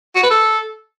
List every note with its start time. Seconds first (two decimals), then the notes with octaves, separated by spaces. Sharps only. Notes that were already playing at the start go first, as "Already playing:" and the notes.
0.16 F#4
0.23 B4
0.31 A4